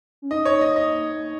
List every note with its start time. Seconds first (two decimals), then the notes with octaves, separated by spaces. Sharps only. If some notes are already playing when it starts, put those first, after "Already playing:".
0.22 C#4
0.31 D#4 D#5
0.45 C#5
0.61 D#5
0.76 D#5